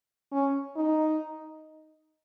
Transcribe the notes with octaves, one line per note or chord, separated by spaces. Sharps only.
C#4
D#4